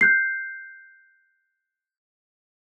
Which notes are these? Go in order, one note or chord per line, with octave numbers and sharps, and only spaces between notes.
F#6 G6 C7